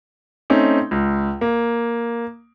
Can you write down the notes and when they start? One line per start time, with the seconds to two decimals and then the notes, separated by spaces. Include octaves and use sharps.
0.50 A3 C4 C#4 D#4
0.91 C#2
1.41 A#3